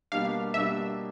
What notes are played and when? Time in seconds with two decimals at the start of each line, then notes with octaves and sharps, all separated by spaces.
0.12 B2 G3 A#3 D4 G4 F5
0.54 B2 G3 A#3 D4 G4 E5